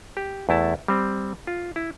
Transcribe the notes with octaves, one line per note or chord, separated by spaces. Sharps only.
G4
E2 A3 E4 A5
G3 C4
F4
E4